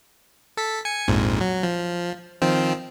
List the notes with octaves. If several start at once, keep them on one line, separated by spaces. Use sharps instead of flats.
A4 B6
G#5 C#7
A#1 F2 G#2
F#3
F3
D#3 F3 C4